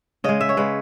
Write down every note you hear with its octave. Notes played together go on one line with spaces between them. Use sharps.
C#3 G#3 D#5
E5
C#5
C#3 G#3 B4